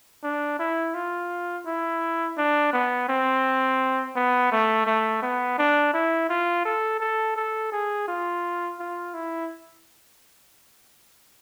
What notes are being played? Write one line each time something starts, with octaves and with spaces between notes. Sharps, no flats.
D4
E4
F4
E4
D4
B3
C4
B3
A3
A3
B3
D4
E4
F4
A4
A4
A4
G#4
F4
F4
E4